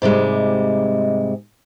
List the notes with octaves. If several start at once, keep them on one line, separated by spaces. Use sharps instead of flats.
G#2 C3 G3 G#3